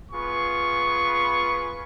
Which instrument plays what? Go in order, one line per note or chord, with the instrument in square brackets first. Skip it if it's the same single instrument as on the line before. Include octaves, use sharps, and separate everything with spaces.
[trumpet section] B3 F4 G#4 B4 C#6